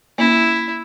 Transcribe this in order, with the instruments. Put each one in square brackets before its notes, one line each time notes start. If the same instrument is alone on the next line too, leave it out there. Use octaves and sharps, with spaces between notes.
[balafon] A#3 C#4 [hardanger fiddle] E4